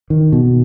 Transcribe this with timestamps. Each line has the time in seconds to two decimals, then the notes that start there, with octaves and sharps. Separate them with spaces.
0.10 D#3
0.32 B2